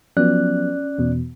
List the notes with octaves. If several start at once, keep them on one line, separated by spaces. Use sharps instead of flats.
F3 F#3 B3 C#4 D5 F#6
E2 B2